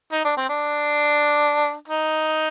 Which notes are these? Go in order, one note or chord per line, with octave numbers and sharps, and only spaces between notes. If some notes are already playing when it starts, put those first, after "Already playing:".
D#4
D4
C4
D4
D#4